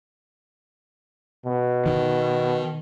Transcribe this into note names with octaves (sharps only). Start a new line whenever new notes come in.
B2
D#3